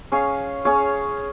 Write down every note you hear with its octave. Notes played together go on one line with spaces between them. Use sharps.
C#4 G#4 C#5 F5
C#4 G#4 C#5 F5